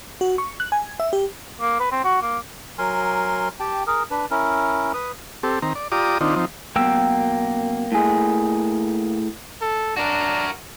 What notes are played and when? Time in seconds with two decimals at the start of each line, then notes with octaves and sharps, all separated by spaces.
0.21 F#4
0.38 C#6
0.60 F#6
0.72 G#5
1.00 E5
1.13 G4
1.61 A#3
1.80 B4
1.92 C4
2.05 F#4
2.22 A#3
2.78 F#3 A#4 G#5 C6
3.60 G4 G5 A5
3.87 G#4 A#4
4.11 D4 B4
4.31 C#4 E4 A#4
4.94 B4 D#6
5.43 C4 G4 A4
5.62 D#3 C4 A#5
5.75 D5
5.92 F4 G4 D5 A#5 D6 D#6
6.21 D#3 C4 D4 D#4 F4
6.36 F3 C4 D#4
6.76 B1 F#2 B2 A#3 G5 E6
7.92 A2 G#4
9.61 A4
9.96 D4 F#4 A#4